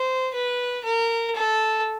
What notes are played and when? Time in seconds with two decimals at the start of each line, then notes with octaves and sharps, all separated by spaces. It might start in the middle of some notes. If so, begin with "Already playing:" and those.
Already playing: C5
0.34 B4
0.84 A#4
1.35 A4